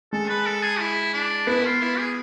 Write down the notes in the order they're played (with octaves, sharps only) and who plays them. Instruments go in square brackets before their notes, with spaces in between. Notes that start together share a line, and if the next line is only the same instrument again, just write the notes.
[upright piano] G#3 [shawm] A4
[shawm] B4
A4
G#4
E4
D4
[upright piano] B3 [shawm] E4
[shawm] F4
E4
G#4